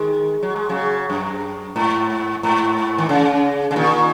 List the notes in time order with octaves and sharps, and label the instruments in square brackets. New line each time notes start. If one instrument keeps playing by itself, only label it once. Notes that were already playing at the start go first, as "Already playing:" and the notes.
Already playing: [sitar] D#3 G#3
F#3
G#3
C#3 F#3
F#2
G#2
G#2
D#3
C#3
C#3
A#2 D#3